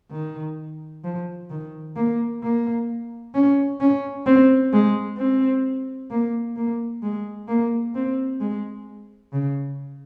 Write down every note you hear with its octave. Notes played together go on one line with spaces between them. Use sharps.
D#3
F3
D#3
A#3
A#3
C#4
C#4
C4
G#3
C4
A#3
A#3
G#3
A#3
C4
G#3
C#3